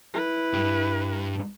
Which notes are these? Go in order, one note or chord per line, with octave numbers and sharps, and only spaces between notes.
E4 B4
G2